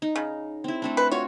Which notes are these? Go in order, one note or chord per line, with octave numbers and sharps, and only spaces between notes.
D#4
C#3
C4 E4
A3 C4 D4
B4
F4 F#4 C#5